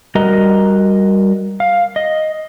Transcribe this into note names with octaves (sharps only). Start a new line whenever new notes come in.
G3 F#4 A#4 D#5 A#5
F5
D#5